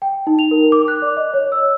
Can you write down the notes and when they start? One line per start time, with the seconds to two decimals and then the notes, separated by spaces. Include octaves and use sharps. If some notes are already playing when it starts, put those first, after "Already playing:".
0.02 G5
0.27 D#4
0.39 F7
0.51 A#4
0.72 D6
0.88 F#6
1.02 D5
1.17 D#5
1.34 C#5
1.52 E6